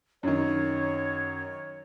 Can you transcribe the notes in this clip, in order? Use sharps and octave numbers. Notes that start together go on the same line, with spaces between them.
F#2 D#3 C#5